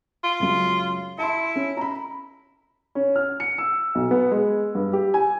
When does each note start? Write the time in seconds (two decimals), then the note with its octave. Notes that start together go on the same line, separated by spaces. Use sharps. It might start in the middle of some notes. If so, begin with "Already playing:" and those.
0.24 F4
0.40 C#2 F#2
1.19 E4 A5 C6
1.56 C#4
1.77 A#5 B5
2.95 C#4
3.16 F6
3.40 C#7
3.58 E6
3.95 B1
4.11 B3
4.31 G#3
4.75 G2
4.93 G4
5.14 G#5